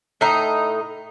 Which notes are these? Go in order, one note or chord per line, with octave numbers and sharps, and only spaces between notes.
A2 D#4